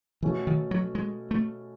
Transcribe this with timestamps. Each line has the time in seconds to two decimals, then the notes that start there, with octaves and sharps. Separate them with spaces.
0.23 B2 E3 A3 C#4 F#4 A4
0.47 D#3
0.71 F#3
0.95 G#3
1.31 A3